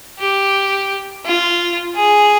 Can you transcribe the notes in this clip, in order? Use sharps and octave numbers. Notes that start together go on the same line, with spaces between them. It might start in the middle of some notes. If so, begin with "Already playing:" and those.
G4
F4
G#4